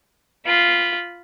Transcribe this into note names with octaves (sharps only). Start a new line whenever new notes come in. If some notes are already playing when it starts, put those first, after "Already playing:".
F4 B5